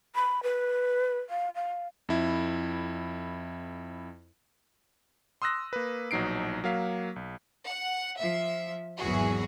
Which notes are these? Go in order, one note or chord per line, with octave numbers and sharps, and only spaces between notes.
B5
B4
F5
F5
F2 E4
C6 D#6 E6 F#6 A#6
A#3 B4
A#1 B2 F#3 D#4 C7 D7
F#3 A#3 F5 B6
B1
F#5
F3 E5
G#1 E2 E3 F#3 F#4 G#4